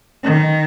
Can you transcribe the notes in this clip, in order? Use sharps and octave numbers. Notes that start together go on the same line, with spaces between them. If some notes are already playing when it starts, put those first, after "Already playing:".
D#3